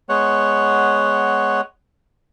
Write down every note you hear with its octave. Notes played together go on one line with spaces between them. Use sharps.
G#3 B3 C#5 F#5